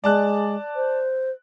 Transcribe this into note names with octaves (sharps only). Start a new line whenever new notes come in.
G#3 D5 A5 F#6
C5